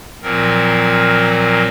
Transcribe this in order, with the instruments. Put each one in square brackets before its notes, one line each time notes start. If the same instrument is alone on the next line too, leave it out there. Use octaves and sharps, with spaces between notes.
[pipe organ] A#2 F3 F#3 C4 A#4